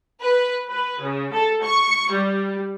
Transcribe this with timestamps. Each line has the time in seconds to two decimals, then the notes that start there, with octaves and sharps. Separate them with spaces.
0.20 B4
0.69 B4
1.01 C#3
1.33 A4
1.63 C#6
2.11 G3